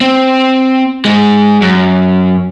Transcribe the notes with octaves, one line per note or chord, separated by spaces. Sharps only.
C4
G#2 G#3
F#2